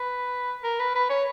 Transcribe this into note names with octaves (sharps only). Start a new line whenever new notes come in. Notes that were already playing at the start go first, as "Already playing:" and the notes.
Already playing: B4
A#4
B4
B4
C#5